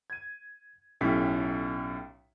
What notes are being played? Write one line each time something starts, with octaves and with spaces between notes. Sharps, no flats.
G#6 D#7
B1 A2 C#4 G4 B6